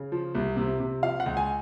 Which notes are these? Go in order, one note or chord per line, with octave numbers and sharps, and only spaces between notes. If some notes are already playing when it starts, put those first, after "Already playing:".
Already playing: C#3
F3
C2
C3
C3
F3 F5
F#5
C#2
G#5